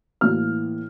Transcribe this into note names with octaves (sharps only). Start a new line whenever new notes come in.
A2 E3 A#3 F6